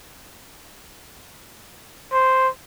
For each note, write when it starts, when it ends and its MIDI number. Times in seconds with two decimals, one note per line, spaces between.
2.13 2.48 72